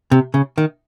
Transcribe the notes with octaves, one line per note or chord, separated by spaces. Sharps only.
C3
C#3
D#3